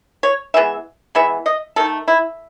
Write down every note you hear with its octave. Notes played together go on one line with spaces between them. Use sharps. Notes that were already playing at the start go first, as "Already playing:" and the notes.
C#5
E3 G#3 B3 E5
E3 G#3 B3 E5
D#5
D#3 A3 A4
E4